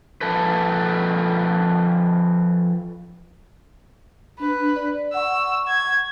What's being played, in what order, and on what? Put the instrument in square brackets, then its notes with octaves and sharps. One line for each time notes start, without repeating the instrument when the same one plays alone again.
[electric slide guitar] F3 A4 B4
[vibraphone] D4 [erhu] B4
[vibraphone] D5
[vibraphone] F#5 C#6 [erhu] E6
[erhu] G#6